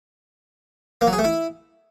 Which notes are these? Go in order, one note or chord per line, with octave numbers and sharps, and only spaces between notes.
A#3
F#3
G#4
A3
E4